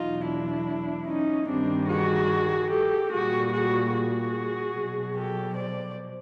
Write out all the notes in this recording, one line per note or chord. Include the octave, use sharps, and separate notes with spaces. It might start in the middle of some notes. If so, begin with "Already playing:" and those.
Already playing: E2 B2 F#3 D#4 F4
D4 E4
C#4 D#4
G2 D#3 G3 C4 D4
F#4 G#4
G4 A4
A#2 G3 F#4 G#4
F#4 G#4
F#4 G#4
B2 F#3
G4 A4
C5 D5